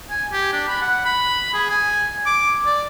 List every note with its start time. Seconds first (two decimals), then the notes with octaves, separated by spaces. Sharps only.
0.10 G#5
0.32 G4
0.53 D4
0.68 B5
0.81 F#5
1.05 B5
1.54 G#4
1.70 G#5
2.26 D6
2.66 D5